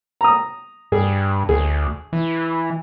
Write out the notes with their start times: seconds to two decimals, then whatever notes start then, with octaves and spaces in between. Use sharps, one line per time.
0.21 A#5 D#6
0.92 G2 G#4
1.49 D2 G#4
2.13 E3